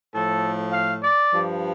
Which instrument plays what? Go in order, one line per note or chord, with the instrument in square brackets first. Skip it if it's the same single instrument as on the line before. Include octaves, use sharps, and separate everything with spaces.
[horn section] A2 F3 A4
F5
D5
G2 F3